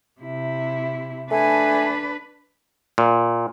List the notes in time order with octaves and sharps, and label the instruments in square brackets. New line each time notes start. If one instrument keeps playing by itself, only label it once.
[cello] C3 E4
[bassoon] A3 [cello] D4 B4 [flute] G#5
[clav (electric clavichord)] A#2